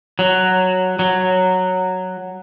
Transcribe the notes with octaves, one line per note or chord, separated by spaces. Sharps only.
F#3
F#3